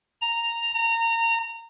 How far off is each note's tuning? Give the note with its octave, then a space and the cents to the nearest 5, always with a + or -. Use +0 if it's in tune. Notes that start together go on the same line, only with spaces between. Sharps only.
A#5 -5
A#5 -25